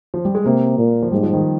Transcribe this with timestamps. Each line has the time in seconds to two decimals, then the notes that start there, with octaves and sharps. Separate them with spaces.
0.14 F3
0.25 G3
0.35 G#3
0.45 C3 A#3
0.78 A#2
1.03 F3
1.11 G#2 G3
1.23 F3
1.33 D#3